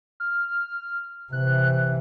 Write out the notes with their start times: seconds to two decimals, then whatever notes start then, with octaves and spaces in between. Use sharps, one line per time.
0.20 F6
1.32 C3 E3 F#6